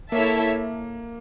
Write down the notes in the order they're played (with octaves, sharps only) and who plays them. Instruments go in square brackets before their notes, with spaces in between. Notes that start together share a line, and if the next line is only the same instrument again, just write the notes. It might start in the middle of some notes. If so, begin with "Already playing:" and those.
[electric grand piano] A#3 [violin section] E4 A4 C#5 E5 A5